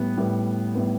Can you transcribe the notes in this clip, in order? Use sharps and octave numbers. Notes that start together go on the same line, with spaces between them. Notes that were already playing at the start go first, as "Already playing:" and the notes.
Already playing: A2 G3 B3
A2 G3 B3
A2 G3 B3